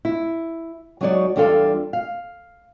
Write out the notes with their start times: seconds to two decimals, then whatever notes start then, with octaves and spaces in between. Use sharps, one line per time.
0.05 E4
1.01 F#3 G#3 D#4 F#4 C#5 D5
1.36 E2 G3 D4 F4 A4 F5
1.93 F5